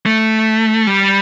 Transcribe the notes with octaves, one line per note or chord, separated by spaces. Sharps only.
A3
G3